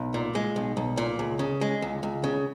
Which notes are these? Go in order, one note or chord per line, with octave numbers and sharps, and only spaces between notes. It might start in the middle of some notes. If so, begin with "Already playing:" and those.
Already playing: B1
A#2
G#3
B1
B1
A#2
C#2
C#3
G#3
C#2
C#2
C#3